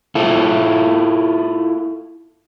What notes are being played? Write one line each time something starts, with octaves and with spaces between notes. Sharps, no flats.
E4 F4 A4